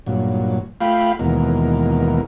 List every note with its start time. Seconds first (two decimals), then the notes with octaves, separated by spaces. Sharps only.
0.06 G2 A#2 F#3
0.81 A3 F4 F5 G5 B5
1.19 D#2 B2 E3 G#3 A#4